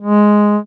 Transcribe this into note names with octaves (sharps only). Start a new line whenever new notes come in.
G#3